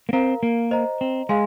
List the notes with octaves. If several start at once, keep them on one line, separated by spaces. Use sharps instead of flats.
A#3
C4 A#4 F5 A#5
A#3
C5 D#5 A#5
C4
G#3 G#4 F5 G#5 C6